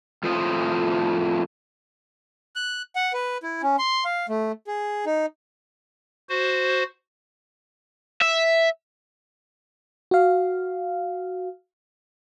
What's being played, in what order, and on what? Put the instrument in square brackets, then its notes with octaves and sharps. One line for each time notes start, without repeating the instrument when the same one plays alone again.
[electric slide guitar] F2 A2 F4 C5 D#5
[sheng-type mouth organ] F#6
F#5
B4
E4
C#4
C6
F5
A3
G#4
D#4
[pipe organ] F#4 C5
[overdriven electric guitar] E5
[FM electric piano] F#4 F5